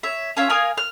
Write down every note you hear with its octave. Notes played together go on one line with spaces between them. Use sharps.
C#5 E5
C#4 F4 C#5 E5
A#4 F5 G#5 D#6
F6